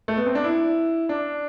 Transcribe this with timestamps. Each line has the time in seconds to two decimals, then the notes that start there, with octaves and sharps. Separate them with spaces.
0.08 A3
0.17 B3
0.26 C4
0.35 D4
0.44 E4
1.09 D4